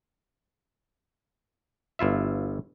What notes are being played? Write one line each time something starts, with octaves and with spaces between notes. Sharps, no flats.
G1 E4 F4 E5